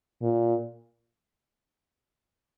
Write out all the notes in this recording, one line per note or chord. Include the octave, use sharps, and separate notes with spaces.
A#2